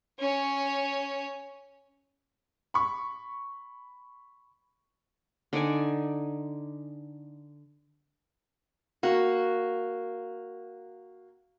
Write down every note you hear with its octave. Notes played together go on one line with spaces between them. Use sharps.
C#4 C#5
B5 C#6
D3 D#4 D5 G#5
A#3 F#4